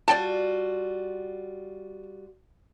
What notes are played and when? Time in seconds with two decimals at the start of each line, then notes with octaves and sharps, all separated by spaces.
0.08 G3 F4 F#4 D5 G5 A5